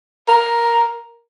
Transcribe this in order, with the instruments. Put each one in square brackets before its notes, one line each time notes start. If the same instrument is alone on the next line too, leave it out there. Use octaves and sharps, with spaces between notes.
[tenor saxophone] A#4